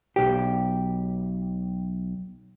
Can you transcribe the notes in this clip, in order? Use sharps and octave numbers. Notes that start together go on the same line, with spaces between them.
B1 G4